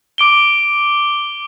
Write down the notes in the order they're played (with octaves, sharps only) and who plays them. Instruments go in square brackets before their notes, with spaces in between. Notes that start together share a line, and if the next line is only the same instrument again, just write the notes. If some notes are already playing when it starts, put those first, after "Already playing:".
[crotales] D6 D7 G7